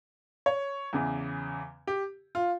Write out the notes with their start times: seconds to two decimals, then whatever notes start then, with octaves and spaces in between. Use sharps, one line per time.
0.46 C#5
0.93 E2 C#3 E3
1.87 G4
2.35 F4